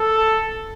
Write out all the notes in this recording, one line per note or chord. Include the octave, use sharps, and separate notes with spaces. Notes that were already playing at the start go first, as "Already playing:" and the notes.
Already playing: A4